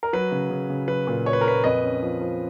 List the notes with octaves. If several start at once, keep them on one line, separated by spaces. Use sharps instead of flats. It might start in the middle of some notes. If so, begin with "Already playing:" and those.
A#4
F#3 B4
C#3
C#3
C#3
F#3 B4
A#2
A#2 C#5
B4
A#4
A#2 B4
F2 B4 D#5
C#4
F3
F3